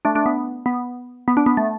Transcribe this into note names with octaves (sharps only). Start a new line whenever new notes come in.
A3 D4
A3 D4
B3
B3
B3
D4
B3
A3